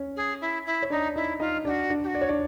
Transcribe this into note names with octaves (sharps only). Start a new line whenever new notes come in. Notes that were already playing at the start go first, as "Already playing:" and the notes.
Already playing: C#4 C#5
G#4
E4
E4
C#5
D4 D#4 D5
D#4 E4 D#5
D#4 F4 D#5
D4 F#4 G4 D5
D4 D5
G4
F#4
D5
C#5
D4 D5